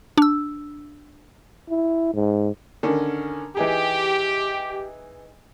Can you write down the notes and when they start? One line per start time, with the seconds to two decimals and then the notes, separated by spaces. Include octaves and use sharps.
0.18 D4 E6
1.70 E4
2.14 G#2
2.83 D3 D#3 C#4
3.57 E3 D#4 G4 G#4